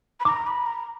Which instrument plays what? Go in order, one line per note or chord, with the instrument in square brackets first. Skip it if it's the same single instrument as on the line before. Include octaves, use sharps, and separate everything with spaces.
[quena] B5
[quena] A#5 [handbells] D6
[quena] B5
A#5